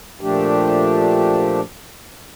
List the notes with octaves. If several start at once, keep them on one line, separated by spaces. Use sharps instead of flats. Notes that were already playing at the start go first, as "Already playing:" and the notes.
A#2 F3 A3 D4 G4